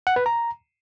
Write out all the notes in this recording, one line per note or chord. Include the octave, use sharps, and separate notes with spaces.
F#5
B4
A#5